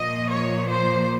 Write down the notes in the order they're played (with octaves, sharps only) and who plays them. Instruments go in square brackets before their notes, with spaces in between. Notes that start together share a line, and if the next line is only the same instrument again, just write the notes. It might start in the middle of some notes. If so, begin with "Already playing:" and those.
Already playing: [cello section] A#2 F3 A#3 D#5
C#5
C5